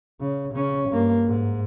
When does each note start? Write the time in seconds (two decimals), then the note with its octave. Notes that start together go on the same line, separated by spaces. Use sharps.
0.21 C#3
0.54 C#3 C#4
0.90 G2 A#3
1.27 G#2